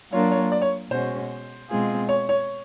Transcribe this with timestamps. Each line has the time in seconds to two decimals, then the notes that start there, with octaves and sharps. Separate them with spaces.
0.12 F#3 A#3 D4 F4 A#4 C#5
0.32 C#5
0.52 D5
0.62 C#5
0.91 B2 G#3 C#4 F#4 C5
1.69 B2 G#3 C4 F4 G#4
2.09 C#5
2.29 C#5